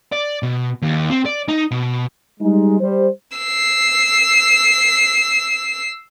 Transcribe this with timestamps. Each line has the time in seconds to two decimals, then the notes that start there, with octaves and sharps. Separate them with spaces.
0.12 D5
0.43 B2
0.82 D#2
1.10 C4
1.25 D5
1.48 D#4
1.71 B2
2.40 G3 G#3 D#4
2.80 G3 C5
3.38 E6 C7